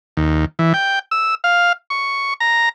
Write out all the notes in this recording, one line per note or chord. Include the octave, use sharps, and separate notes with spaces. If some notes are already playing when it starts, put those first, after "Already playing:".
D#2
E3
G5
E6
F5
C#6
A#5